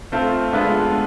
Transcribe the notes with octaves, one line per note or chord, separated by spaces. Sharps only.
A3 C4 F4 A4
G#3 B3 D4 F4 A4